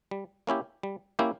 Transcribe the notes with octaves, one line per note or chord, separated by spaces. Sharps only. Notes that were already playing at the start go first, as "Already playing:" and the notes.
G3
A#3 C#4 E4 G4
G3
A#3 C#4 E4 G4